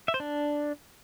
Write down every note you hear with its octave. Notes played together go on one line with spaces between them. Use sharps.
E5
C5
D4